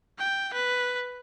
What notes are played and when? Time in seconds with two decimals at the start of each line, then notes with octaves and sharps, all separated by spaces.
0.19 G5
0.54 B4